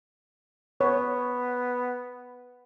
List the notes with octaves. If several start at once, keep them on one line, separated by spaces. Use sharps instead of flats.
B3 C#5